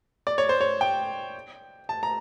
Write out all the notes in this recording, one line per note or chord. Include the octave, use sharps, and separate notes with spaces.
D5
C#5
C5
C#5
G5
A5
A#5